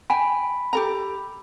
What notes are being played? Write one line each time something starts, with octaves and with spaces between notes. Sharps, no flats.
G5 G#5 B5
G4 A4 A#5